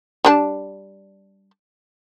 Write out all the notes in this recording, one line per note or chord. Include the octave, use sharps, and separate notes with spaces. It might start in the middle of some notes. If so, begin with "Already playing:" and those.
G3 D4 A5